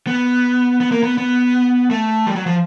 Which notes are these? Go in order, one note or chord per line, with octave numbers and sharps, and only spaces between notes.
B3
B3
A#3
B3
B3
A3
G3
F#3
F3